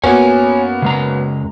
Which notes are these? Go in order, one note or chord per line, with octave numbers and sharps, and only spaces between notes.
F#2 A#3 B3 F#4 C#5 G#5
C#3 G#3 A#5